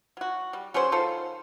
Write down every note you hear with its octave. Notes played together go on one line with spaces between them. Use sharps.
F#3 F#4
G3
F#3 C#4 G#4 C5
D#3 F4 A4 C5